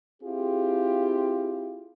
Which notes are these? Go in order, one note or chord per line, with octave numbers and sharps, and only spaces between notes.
C4 E4 F4 G4 G#4